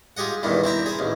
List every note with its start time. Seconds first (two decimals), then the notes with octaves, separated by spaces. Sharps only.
0.17 F4 G4 G#4 D#5 F#5
0.43 E2 G2 A#2 D#3
0.64 C4 E4 G5 A#5
0.86 G#4 C5
0.99 A1 D#2